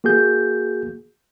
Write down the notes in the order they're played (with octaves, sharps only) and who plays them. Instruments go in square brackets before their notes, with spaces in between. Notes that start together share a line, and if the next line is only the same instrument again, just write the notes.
[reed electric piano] A#3 F#4 G#4 G6